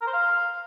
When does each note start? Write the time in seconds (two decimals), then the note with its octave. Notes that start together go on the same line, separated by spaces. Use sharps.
0.01 A#4
0.07 C5
0.13 F5